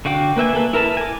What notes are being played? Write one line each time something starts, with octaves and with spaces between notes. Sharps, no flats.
D3 F#4 F5 G5 D6
A#3 B4 E5 G#5
A#3 A4 B4
E4 A#4 B4 A5
G#5 D6